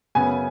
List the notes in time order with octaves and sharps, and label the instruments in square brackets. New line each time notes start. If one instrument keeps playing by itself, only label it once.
[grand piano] F#2 C#3 B3 G#5